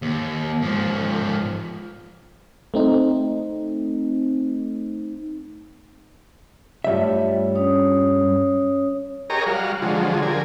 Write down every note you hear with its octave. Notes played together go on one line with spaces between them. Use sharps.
D#2
G#2 F3
A3 C4 D#4
G2 G3 A3 F4 C#5 E5
C#4 C#5 D#6
G4 G#4 A#4 C#5 D#5 A#5
G3 F#4 F5
D3 F3 F#3 G#3
D3 G3 A#4 G#5